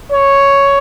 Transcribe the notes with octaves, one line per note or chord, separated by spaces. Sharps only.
C#5